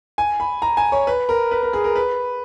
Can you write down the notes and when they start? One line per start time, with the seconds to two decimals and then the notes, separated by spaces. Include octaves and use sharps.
0.18 G#5
0.40 B5
0.62 A#5
0.77 G#5
0.92 C#5
1.07 B4
1.29 A#4
1.51 B4
1.63 A#4
1.73 G#4
1.84 A#4
1.96 B4